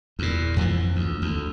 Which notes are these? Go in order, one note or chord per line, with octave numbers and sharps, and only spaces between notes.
E2 A#2
F2 E3 F3
D2
D2